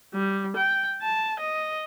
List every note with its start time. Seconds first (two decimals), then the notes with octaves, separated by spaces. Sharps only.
0.14 G3
0.57 G5
1.02 A5
1.40 D#5